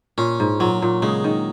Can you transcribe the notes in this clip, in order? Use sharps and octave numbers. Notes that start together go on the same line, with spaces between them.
A#2 C#4
G#2
A#2 F#3
A#2
C#3 G#3
D#3